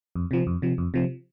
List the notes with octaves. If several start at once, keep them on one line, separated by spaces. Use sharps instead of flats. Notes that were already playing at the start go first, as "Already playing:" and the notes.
F2
C3 F3
F2
C3 F3
F2
C3 F3